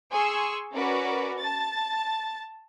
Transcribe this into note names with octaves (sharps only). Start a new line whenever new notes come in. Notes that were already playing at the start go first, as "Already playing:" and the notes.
G#4 G#5 C6 C#6 E6
C#4 F#4 A#4 B4 D5
A5 A6